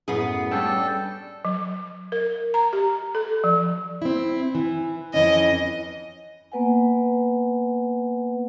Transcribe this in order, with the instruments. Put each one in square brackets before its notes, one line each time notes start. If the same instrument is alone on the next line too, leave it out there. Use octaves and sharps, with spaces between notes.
[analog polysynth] F#2 A2 [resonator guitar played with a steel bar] B3 G#4
[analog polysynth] G3 C#4 D4 [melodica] A4 G5 A5
[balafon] F#3
A#4
A#5
G4
A4
F3
[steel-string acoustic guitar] C4 E4
E3
[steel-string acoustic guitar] F2 E3 C#4 [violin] D#5
[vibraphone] A#3 B3 B4 F#5 G#5